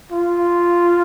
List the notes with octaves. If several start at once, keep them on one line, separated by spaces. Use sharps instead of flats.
F4